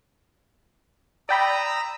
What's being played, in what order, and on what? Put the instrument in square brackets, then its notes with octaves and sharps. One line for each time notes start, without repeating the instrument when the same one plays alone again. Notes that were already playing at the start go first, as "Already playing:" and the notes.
[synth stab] D5 G5 B5 [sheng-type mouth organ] A#5 D#6 E6